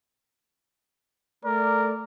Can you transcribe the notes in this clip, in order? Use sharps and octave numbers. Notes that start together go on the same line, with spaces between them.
A3 A#4 D5